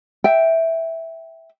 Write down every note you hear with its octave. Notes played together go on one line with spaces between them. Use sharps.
E5 G5